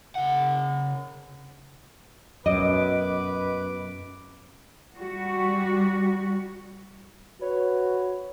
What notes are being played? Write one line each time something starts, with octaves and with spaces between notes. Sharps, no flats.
C#3 F#5
F#2 B2 B4 D#5 D6
G3 F#4
F#4 B4 C#5